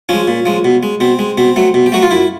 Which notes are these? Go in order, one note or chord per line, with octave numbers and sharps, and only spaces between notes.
F3 G#3 C#4
A#2
F3 G#3
B2
G#3
B2 C4
G#3
B2 C4
F#3 A3
B2
G4
F#3 A3 F#4
F4
F#2 E4